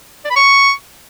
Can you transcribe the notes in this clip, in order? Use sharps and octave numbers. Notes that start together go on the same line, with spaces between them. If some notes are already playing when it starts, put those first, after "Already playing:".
D5
B5
C#6